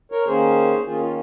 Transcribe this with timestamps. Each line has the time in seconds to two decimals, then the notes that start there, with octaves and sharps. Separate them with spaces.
0.12 A#4 C#5
0.26 D#3 A#3 C#4 G#4 C5
0.86 D#3 A#3 C#4 F4 G#4
1.01 F4